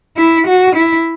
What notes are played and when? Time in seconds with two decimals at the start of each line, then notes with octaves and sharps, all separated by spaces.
0.17 E4
0.48 F#4
0.76 E4